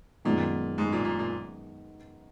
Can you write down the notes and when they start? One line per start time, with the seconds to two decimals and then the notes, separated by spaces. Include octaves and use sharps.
0.25 F#2 A#2 D#3 G#3 B3
0.78 G#2
0.92 A#2
1.05 A#2
1.19 A#2